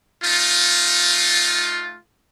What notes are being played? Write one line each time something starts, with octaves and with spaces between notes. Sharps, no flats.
A3 D#4 F4